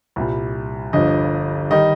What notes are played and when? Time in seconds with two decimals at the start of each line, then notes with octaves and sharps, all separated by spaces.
0.16 C2 A#2 G3
0.93 G1 G2 F3 D#5
1.71 D#3 G3 D#5